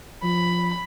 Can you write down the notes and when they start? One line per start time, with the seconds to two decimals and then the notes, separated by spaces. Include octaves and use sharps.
0.23 F3 B5